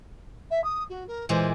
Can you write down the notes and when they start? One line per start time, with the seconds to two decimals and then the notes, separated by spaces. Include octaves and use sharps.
0.50 E5
0.64 D#6
0.90 F#4
1.07 A#4
1.29 A#2 E3 G#3 C5